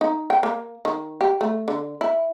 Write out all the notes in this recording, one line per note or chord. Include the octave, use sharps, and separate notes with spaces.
D#4
G5
A#3
D#3
G4
A3
D3
E4